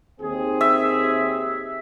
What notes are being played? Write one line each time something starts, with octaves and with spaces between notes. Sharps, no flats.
D#2 C4 G#4
E5